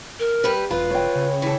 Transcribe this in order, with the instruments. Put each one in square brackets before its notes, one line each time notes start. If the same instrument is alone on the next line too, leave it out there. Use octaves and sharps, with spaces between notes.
[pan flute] A#4
[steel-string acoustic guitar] G3 G4 B4
[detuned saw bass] E1 [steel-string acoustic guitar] F4 [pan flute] B4 [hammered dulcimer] B5
[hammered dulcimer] C#5 G5
[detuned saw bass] C#3
[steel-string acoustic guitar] E3 A4